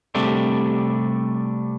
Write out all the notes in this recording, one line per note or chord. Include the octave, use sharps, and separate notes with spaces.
C3 G3 A3 D4